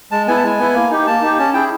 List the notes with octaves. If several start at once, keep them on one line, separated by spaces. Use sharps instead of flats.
G#3 A5
B3 E4 G#5
A5
G#3 G#5
B3 E4
A#3
D#4 G4
A#3 A5
D#4 G4
C#4 A5
E4 G#4 G5